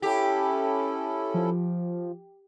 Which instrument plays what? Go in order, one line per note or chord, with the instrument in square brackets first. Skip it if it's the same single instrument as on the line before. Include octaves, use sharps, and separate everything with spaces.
[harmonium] C#4 E4 A4 [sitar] G4
[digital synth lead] F3